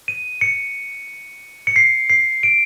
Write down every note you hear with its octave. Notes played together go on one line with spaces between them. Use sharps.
D#7
C#7
C#7
C7
C7
D7